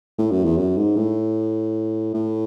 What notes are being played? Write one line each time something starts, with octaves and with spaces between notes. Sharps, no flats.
A2
F#2
E2
F#2
G#2
A2
A2